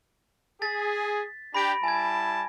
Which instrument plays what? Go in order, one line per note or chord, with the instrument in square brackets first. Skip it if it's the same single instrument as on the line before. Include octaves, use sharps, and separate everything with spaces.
[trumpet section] G#4 [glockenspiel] A6 B6
[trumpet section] D4 G4 [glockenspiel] B5 A#6 D7
[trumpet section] G3 E4 A5 [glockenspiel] G#5 G#6